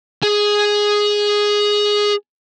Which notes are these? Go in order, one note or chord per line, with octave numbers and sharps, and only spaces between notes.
G#4 G#5